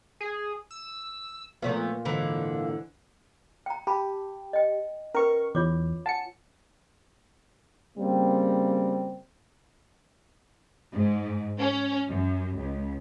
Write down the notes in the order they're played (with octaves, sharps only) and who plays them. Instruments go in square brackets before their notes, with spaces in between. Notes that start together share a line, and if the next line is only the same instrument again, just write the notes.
[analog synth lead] G#4
E6
[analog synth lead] A#2 [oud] F3 A3 B3
[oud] G#2 D3 E3
[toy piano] G5 A#5
[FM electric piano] G4 [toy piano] A5 B5
[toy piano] D#5 G5
[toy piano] C#4 B4 [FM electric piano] A#4 C#6
[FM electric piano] E2 [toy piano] F4 C#5 D6
[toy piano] F#5 G#5 [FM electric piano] A5 C#7
[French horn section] C#3 G3 A#3 C4
[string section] G#2
C#4
F#2
C#2